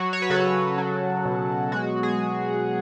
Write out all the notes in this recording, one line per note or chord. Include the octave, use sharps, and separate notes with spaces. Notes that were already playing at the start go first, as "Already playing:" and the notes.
Already playing: F#3 F#4
C#5
B4
C#3 F#4 A4
F#3
B2
G#3 F#4
G#4